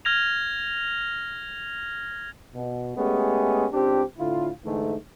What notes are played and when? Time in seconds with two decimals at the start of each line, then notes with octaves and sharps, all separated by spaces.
0.05 F6 G#6 A#6 F7
2.55 B2
2.96 G#3 A3 B3 C#4 G4 G#4
3.73 C#2 C4 D4 G4
4.18 A2 D3 E4 F4
4.64 G#2 D3 E3 A3